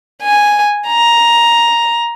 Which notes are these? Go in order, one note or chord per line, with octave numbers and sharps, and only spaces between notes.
G#5
A#5